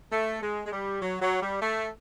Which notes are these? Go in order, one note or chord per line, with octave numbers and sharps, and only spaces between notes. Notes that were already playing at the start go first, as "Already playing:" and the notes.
A3
G#3
G#3
G3
F#3
F#3
G3
A3